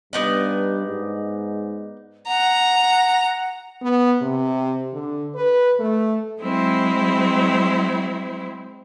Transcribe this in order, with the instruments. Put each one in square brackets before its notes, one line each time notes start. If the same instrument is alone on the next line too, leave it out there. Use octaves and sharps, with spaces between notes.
[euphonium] G2 [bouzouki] B3 D#4 D5
[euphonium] G#2
[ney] F#5 [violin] A#5
[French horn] B3
C3
D3
B4
A3
[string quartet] F#3 G#3 C4 E4 C5